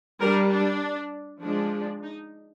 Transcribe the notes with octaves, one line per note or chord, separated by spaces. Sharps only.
G3 D4 A#4
D4
F3 G#3 D4
D#4